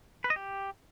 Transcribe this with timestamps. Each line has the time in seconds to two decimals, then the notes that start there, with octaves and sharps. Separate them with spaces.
0.24 B4
0.30 D#5
0.36 G4